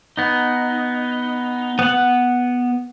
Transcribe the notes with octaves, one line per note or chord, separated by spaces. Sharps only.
B3 D#4
B3 F#5